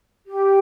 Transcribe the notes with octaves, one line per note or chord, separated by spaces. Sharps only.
G4